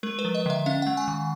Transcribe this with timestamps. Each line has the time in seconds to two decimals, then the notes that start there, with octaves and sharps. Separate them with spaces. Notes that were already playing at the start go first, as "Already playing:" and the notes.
0.03 G#3 A#4
0.19 B4
0.25 F3
0.35 D#5
0.46 D3 E5
0.66 C#4 F5
0.82 G#3 F#5
0.97 G#5
1.08 D#3